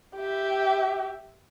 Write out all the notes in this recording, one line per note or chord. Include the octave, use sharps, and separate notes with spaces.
G4 E5